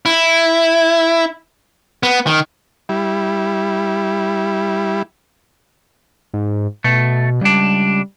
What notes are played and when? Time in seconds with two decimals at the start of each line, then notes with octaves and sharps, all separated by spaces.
0.06 E4
2.03 B3
2.27 D#3
2.89 G3 E4
6.34 G#2
6.84 B2 A3
7.41 C#2 G3 D4